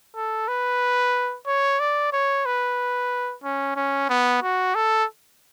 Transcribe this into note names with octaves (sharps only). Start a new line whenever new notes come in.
A4
B4
C#5
D5
C#5
B4
C#4
C#4
B3
F#4
A4